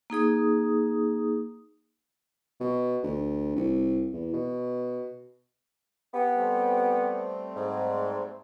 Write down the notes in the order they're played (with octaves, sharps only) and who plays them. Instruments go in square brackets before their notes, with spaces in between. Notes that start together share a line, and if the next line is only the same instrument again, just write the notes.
[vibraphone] A#3 D#4 G#4 D#6
[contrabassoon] B2
D2
C2
E2
B2
[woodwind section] B3 G4
[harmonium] G3 A3 C4
[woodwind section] G#2